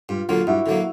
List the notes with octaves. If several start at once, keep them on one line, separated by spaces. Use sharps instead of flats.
G2 F4
D3 F#3 A#3 F4
G2 E4 F#4
D3 F#3 A#3